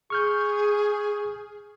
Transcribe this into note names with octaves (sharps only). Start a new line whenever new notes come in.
G#4 C#6 F6 G6